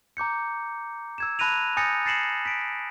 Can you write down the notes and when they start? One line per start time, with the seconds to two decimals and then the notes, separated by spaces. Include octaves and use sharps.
0.17 A#5 D6 G6 C#7
1.18 E6 G#6 E7
1.39 A5 B5 F#6 A#6 D#7 F7
1.77 G#5 D#6 G6 A6 A#6 C#7
2.05 A6 A#6 C7 C#7 E7 F#7
2.45 B6 D7